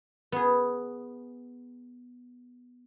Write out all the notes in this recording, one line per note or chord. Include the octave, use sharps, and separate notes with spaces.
B3 G#4